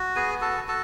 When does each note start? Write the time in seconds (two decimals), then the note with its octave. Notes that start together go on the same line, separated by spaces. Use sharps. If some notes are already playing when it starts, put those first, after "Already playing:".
Already playing: F#4
0.15 B3 G#4 G#5
0.41 F#4 A4 A5
0.68 F#4 A4 A5